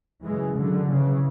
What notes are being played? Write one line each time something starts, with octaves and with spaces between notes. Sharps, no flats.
F#2 C#3 E3 G#3
D3 F#3
C#3 E3